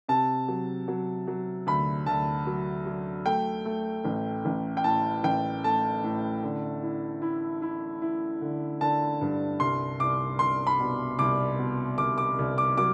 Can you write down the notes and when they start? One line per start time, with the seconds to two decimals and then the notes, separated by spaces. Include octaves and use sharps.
0.08 C3 A5
0.48 F#3
0.88 F#3
1.28 F#3
1.66 D2 B5
2.06 D2 A5
2.47 F#3
2.86 F#3
3.25 A3 G5
3.65 A3
4.05 A1
4.45 A1
4.77 G5
4.84 A2 A5
5.24 A1 G5
5.64 A3 A5
6.04 A2
6.43 D3
6.83 E4
7.22 E4
7.62 E4
8.02 E4
8.41 D3
8.81 D3 A5
9.21 G2
9.60 C2 C6
10.00 C2 D6
10.39 C2 C6
10.67 B5
10.80 B2
11.19 C2 D6
11.59 B2
11.98 C2 D6
12.18 D6
12.39 C2
12.58 D6
12.77 F#3 D6